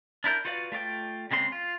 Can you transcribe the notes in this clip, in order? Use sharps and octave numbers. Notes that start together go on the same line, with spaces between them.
D4 E4 A#4 G6
F4 F#4 B4 D5 F5
A3 F4 D5 G5
C#3 G#3 C4 C6
F4